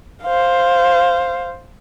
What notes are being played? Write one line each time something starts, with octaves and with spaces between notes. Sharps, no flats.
C5 F5